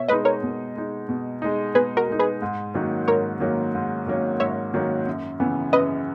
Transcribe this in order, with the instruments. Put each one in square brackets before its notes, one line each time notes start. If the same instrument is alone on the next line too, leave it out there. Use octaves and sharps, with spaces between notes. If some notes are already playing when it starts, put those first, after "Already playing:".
Already playing: [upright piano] B2 [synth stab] C#5 E5
[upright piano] G#3 [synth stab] B4 D#5
[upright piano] D#4
[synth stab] A#4 C#5
[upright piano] B2
G#3 D#4
B2
G#3 D#4
[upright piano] B2 [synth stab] G#4 B4
[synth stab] F#4 A#4
[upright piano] G#3 D#4
[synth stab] G#4 B4
[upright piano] G#2
D#3 F#3 A#3 C#4
[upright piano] G#2 [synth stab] A#4 C#5
[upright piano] D#3 F#3 A#3 C#4
G#2
D#3 F#3 A#3 C#4
[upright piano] G#2 [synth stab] C#5 E5
[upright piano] D#3 F#3 A#3 C#4
F#2
C#3 E3 B3
[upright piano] F#2 [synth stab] B4 D#5